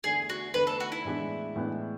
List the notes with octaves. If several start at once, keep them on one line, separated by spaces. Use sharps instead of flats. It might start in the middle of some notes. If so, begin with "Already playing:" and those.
E2 D3 A3 G#4
F#4
E2 D3 A3 B4
A4
F#4
E4
A2 E3 G#3 B3 D4
A2 E3 G#3 B3 D4